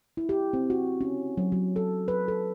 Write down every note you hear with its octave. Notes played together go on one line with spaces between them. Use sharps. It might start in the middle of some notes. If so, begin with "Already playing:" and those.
E4
G4
C4
F#4
C#4
F#3
F#3
A4
B4
A4